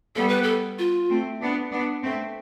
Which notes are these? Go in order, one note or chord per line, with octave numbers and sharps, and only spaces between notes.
G3 B3 A4
B4
A4
F4
A3 C4
B3 D4
B3 D4
A3 C4